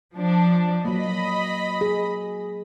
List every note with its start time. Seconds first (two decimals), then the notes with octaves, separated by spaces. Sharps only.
0.14 F3 D4
0.85 F#3 A#3 D#5 B5
1.81 G#4